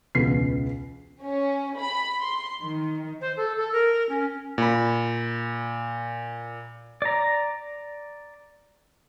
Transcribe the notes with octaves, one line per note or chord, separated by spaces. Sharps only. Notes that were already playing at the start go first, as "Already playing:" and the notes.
E1 C#2 B3 B6 C7
C#4
B5
C6
D#3
C5
A4
A4
A#4
C#4
A#2 B5
D5 A#5